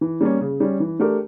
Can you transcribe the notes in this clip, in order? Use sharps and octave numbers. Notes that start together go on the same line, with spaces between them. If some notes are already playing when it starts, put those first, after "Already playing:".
E3
G3 A#3 C#4
C#3
G3 C#4
E3
A3 D4 G4 A#4